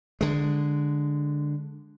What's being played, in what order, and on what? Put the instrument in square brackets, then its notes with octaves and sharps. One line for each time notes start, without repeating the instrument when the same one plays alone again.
[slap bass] D3 G#3